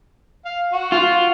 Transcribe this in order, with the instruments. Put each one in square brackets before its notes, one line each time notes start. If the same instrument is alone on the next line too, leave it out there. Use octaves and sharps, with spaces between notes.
[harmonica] F5
F#4
[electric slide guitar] F4